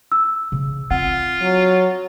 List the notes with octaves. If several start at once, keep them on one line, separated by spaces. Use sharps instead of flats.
E6
C#3
C4 F4 F#5
F#3